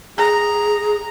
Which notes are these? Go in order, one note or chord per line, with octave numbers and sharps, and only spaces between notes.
G#4 A#5